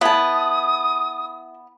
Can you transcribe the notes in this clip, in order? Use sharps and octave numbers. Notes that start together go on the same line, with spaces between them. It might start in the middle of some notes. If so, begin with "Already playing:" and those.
B3 E4 A5 D#6